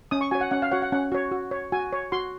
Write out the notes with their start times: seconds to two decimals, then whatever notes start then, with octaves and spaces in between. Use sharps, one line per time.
0.11 C#4 D#6
0.21 C#6
0.31 F#4 C#5 G#5
0.41 F#5
0.51 C#4 F#5
0.62 F5
0.71 F#4 C#5 F#5
0.82 F#5
0.92 C#4 F#5
1.12 F#4 C#5
1.32 F#4
1.51 C#5
1.72 F#4 G#5
1.93 C#5
2.12 F#4 C6